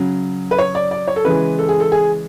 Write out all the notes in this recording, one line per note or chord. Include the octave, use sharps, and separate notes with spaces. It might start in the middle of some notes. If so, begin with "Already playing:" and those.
Already playing: C#3 F#3
B4
C#5
D5
D5
C#5
A4
C#3 E3 G#3 B4
A4
G#4
A4
G#4